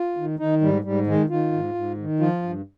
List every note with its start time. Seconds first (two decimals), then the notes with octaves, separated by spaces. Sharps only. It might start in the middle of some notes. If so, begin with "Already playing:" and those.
Already playing: F4
0.16 D#3
0.39 D#3 D#4
0.61 G#2 G3
0.84 G#2 G3
1.07 D#3 G#3
1.29 D#3 F4
1.52 G#2
1.75 G#2
1.98 D#3
2.20 F3 F4
2.42 G2